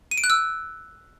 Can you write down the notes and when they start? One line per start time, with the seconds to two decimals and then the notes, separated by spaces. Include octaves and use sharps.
0.11 D#7
0.18 D7
0.24 F#6
0.30 E6